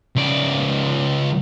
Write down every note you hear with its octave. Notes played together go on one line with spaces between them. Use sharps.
C#2 D5